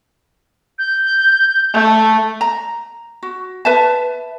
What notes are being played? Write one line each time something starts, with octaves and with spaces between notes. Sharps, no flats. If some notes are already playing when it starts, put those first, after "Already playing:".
G6
A3
A#5
F#4
B4 E5 A5